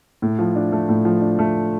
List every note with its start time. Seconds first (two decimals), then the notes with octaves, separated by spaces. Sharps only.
0.22 A2
0.39 F3
0.56 D4
0.72 A3
0.89 A2
1.05 F3
1.21 D4
1.39 A3